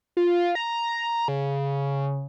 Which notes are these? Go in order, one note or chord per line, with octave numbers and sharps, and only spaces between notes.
F4
A#5
C#3